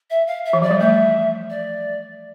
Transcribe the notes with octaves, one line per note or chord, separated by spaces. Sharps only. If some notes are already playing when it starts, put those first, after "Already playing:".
E5
F5
E5
E3
F3 D5
G3
A3 E5
D5